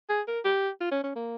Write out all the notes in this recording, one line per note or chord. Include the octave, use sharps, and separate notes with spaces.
G#4
A#4
G4
F4
C#4
C#4
A#3